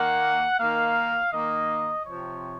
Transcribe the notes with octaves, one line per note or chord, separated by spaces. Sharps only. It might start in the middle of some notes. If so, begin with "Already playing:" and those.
Already playing: D#3 A#3 F#5
D#3 A#3 F5
D#3 A#3 D#5
C3 F3 C4 C#5